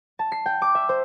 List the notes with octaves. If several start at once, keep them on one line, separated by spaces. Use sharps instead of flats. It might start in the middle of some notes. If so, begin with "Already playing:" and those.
A5
C7
G5
D6
E5
C5